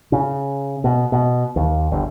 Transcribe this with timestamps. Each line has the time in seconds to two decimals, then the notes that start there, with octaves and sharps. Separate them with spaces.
0.12 C#3
0.84 B2
1.12 B2
1.56 D#2
1.92 G1